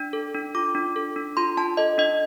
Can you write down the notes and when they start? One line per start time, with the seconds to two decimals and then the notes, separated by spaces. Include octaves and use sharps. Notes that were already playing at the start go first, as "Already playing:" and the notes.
Already playing: D4
0.13 A4
0.34 D4
0.55 F4 D6
0.75 D4
0.96 A4
1.16 D4
1.37 F4 C6
1.57 D4 A5
1.77 A4 D#5
1.98 D4 D#5